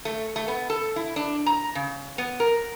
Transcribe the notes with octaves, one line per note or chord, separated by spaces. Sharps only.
A3
A3
B3
A4
E4
D4
A#5
C#3
B3
A#4